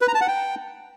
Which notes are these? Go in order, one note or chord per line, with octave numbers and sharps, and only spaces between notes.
B4
A#5
A5
F#5
G5